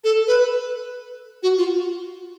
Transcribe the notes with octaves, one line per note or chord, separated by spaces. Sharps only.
A4
B4
F#4
F4